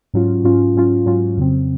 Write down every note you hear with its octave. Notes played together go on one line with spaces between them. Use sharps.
G#2 F#3 C#4 F4
G#2 F#3 C#4 F4
G#2 F#3 C#4 F4
G#2 F#3 C#4 F4
F2 C#3 F#3 C4